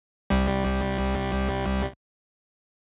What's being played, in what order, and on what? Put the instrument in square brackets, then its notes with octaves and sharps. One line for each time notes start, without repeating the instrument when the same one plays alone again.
[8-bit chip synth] C2 G3